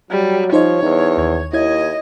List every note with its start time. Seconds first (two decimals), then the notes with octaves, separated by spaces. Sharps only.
0.11 F#3 G3
0.52 F3 D#4 C5 C#5 D#5
0.83 E2 D#4
1.18 D#2 G#6
1.53 D#2 E4 C#5 D#5 G#6